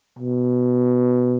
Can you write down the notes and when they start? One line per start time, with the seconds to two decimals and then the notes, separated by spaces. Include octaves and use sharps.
0.19 B2